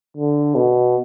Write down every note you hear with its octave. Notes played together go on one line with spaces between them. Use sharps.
D3
B2